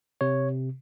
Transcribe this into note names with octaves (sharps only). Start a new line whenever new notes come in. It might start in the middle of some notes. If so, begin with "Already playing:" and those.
C3 C#5